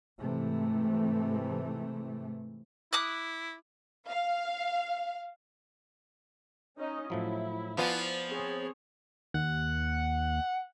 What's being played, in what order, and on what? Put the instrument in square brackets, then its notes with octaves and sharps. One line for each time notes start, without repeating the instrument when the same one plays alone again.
[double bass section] G#2 C3 E3 A3
[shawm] E4 [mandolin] D6 D#6 F#6
[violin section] F5
[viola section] C#4 D#4 D#5
[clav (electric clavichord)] A2 F3 F#3 [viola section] E4
[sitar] F3 B3 F4 [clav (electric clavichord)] D5 G#5
[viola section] C4 G#4 C#5
[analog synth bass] D#2 [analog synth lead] F#5